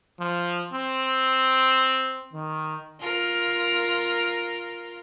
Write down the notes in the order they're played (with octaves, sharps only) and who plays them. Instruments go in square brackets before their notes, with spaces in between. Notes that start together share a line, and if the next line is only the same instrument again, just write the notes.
[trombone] F3
C4
D#3
[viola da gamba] F4 A#4